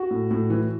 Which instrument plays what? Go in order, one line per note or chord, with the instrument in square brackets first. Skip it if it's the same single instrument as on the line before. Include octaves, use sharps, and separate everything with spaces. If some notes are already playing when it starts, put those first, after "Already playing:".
Already playing: [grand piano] F#4
A2
A2
E3